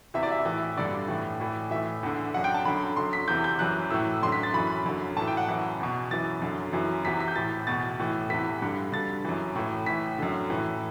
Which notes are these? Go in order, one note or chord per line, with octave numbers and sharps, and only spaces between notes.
E2 C3 E3 E5
D5
E5
A2 E3
G2 D3 D5
A2 E3
A2 E3
A2 E3 E5
E2 D3
F#2 D3 F#5
G5
A5
F#2 D3 B5
F#2 D3 C6
B6
E2 C3 E3 G6
G6
F#2 E3 F#6
A2 E3 E6
F#2 D3 C6
B6
A6
F#2 E3 B5
F#2 D3
A2 E3 A5
G5
F#5
F#2 E3
E2 B2
F#2 E3 A6
F#2 D3
F#2 E3
E2 C3 E3 B6
B6
G6
A2 E3 A6
E2 B2 A6
A2 E3
E2 C3 E3 B6
G2 D3
G2 D3 A6
F#2 E3
A2 E3
A2 E3 B6
F#2 D3
A2 E3